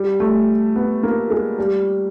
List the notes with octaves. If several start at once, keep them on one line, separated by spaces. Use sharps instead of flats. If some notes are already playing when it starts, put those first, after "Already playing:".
Already playing: G3
A3
B3
A#3
G#3
G3